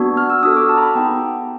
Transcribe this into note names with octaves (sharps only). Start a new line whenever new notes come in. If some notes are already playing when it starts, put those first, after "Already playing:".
Already playing: B3 D4 F#4
F6
E6
D4 F#4 A4 D#6
D6
A5
A#5
B5
B3 D#4 G#4 G5